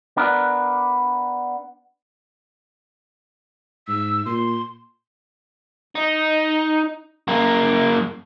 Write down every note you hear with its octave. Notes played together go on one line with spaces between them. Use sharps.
B3 D4 A#4
G#2 E6
A#2 C6
D#4
F#2 A#3